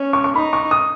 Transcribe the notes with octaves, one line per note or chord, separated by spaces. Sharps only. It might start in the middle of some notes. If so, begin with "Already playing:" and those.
Already playing: C#4
C#6
C#6
D#4 B5
C#6
D#6